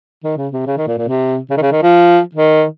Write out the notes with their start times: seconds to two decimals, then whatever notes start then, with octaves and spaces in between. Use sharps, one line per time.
0.24 D#3
0.38 C#3
0.53 C3
0.67 C#3
0.78 D#3
0.87 A#2
0.98 A#2
1.08 C3
1.50 C#3
1.57 D#3
1.62 C#3
1.72 D#3
1.82 F3
2.35 D#3